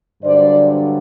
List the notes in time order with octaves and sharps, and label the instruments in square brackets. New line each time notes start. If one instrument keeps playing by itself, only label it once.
[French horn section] G2 D3 F#3 C5 D5